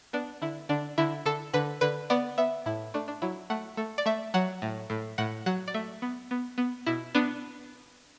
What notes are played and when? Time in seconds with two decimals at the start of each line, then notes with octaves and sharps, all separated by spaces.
0.13 B3 D4
0.42 D3 E4
0.69 D3 D4
0.98 D3 E4
1.26 D3 A4
1.54 D3 B4
1.81 D3 B4
2.10 B3 D5
2.38 B3 E5
2.66 A2 E4
2.94 A3 D4
3.08 D4
3.22 F#3 E4
3.50 A3 F#5
3.77 A3
3.98 D5
4.06 A3 E5
4.34 F#3 F#5
4.62 A2
4.90 A2
5.18 A2 F#5
5.46 F#3 F#5
5.68 D5
5.74 A3 E5
6.02 B3
6.31 B3
6.58 B3
6.86 B2 E4
7.15 B3 D4